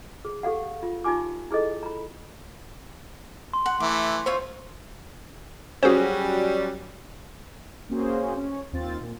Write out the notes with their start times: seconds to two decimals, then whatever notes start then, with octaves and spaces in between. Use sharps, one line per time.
0.25 G#4
0.43 G4 A4 F5 F#5
0.83 F4
1.04 D#4 F4 G4 G#5 D6
1.51 E4 G#4 A4 D#5
1.83 A#5 B5
3.53 C6
3.66 F#5
3.80 E3 A3 D6
4.26 F4 C5 C#5 E5
5.83 F#3 G3 C#4 F#4 G#4 C5
7.89 A#3 C4 C#4 F#4 G#4 C5
8.37 C#4
8.73 D#2 C4 F4 A6
9.01 A#2